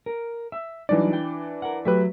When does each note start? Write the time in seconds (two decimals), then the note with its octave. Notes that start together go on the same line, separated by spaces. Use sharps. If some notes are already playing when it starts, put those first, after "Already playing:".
0.06 A#4
0.52 E5
0.89 E3 F#3 G3 D4 D#4 D5
1.13 G5
1.62 A#4 F#5
1.85 F#3 A3 G4 B4 E5